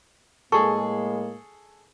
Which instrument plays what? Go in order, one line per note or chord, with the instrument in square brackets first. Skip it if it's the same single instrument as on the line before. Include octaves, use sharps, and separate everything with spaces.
[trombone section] A2 G#3 A#3 [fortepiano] G#4 A4 [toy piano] C#6